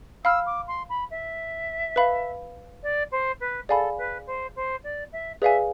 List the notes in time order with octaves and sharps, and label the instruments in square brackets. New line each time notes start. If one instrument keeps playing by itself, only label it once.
[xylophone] F5 B5 F6 [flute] E6
[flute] D6
C6
B5
E5
[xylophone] B4 F5 B5
[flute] D5
C5
B4
[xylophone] G#4 D5 F5 G#5 B5 [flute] A4
[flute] B4
C5
C5
D5
E5
[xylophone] G#4 B4 D5 F5 G#5 [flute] E5